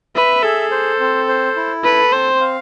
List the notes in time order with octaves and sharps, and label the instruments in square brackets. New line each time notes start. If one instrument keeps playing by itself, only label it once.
[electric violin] B4 [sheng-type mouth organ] E5
[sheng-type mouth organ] G#4 [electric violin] A4
[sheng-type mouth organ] C5
C4
C5
E4
[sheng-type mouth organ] A4 [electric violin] B4
[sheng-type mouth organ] C4 [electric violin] C5
[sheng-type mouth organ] F5